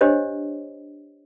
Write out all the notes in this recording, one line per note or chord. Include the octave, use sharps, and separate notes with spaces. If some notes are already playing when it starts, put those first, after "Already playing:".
D4 G4 C5 C#5 D#5